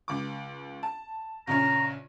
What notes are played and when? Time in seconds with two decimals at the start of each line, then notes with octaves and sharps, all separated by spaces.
0.08 C#2 D6
0.83 A5
1.47 A#1 C#3 C#4 A#5